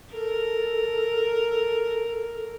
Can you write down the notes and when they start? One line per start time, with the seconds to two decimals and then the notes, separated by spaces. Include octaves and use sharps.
0.12 A4 A#4